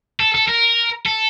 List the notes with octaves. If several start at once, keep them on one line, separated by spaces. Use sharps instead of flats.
A4
A4
A#4
A4